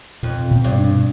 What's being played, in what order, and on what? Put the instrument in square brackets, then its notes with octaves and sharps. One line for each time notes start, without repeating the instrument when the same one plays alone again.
[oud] F2 [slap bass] B2
[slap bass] B2
[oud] G2
[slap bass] D4